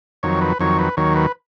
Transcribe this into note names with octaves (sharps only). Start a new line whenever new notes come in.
F2 D#3 F#3 C#5
B4
F2 D#3 F#3 C#5
B4
D#2 D#3 F#3 C#5
B4